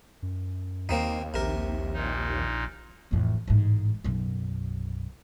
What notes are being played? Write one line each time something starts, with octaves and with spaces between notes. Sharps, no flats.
F#2
D#2 A#3 C4 D#4
A#1 C3 A#4
A#2 D#4
A1 F2
A1 G#2
B1 F#2